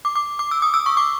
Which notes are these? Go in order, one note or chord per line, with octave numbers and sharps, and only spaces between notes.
D6
D6
D6
E6
D#6
E6
C#6
D6